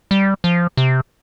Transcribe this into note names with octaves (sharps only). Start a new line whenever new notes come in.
G3
F3
C3